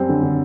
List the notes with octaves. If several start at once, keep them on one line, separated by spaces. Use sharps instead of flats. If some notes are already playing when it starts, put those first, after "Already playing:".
Already playing: F#2 G3 C4
D3
D3